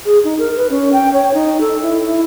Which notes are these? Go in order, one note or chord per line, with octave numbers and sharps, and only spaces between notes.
G#4
D#4
A#4
B4
C#4
G5
C#5
D#4
A4
E4
E4